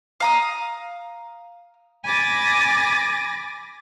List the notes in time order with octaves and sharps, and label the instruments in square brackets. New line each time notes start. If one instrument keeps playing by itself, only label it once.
[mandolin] F5 A#5 D#6
[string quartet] G#5 B5 D6 A6 A#6